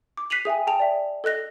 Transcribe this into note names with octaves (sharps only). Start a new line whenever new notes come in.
D6
F#6 B6 C7 D#7 F7 F#7
G#4 E5 G5 G#5
G#4 G5 A5 F7
D5 E5
A4 D#5 F#6 A#6